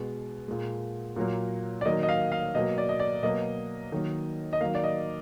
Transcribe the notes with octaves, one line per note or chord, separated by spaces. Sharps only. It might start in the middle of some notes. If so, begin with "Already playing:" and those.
Already playing: B2 G#3
A#2 G#3
A#2 F#3 A#3
D5
D#3 F#3 A#3 D#5
D#5
F5
F5
B2 F#3 A#3 D#5
D5
D#5
D5
B2 F#3 A#3 D#5
D#3 F#3 A#3
D#5
D#3 F#3 A#3 F5
D5
D#5